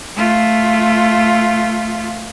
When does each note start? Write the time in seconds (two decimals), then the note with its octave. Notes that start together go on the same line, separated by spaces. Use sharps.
0.16 A3 F4